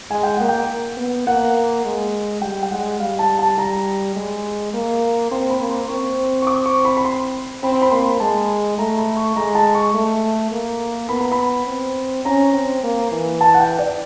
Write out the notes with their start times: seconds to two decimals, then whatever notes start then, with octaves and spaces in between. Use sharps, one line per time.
0.11 G#3 G#5
0.23 G5
0.37 A#3 F#5
0.49 G5
0.97 B3
1.27 A#3 F#5
1.85 G#3
2.42 G3 G5
2.63 G5
2.71 G#3 F#5
3.00 G3 F5
3.19 A5
3.39 A5
3.58 G3 A#5
4.16 G#3
4.74 A#3
5.31 C4 C6
5.50 B5
5.60 A#3
5.70 C6
5.89 C4 C#6
6.42 C#6
6.47 D6
6.66 C#6
6.85 B5
6.97 B5
7.05 C6
7.63 C4 B5
7.72 C6
7.82 B5
7.91 A#3 C6
8.00 B5
8.20 G#3 A5
8.78 A3 A#5
8.97 B5
9.17 C#6
9.36 G#3 A#5
9.55 A5
9.75 C#6
9.94 A3
10.51 A#3
11.09 B3 B5
11.21 A#5
11.32 B5
11.67 C4
12.25 C#4 A#5
12.53 C4
12.83 A#3
13.12 E3
13.41 A5
13.54 F#5
13.60 G5
13.79 D5